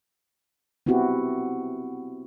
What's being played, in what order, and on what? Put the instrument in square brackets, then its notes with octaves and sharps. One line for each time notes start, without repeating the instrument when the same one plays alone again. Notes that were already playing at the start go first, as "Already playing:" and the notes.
[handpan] B3 C4 E4 F#4 G4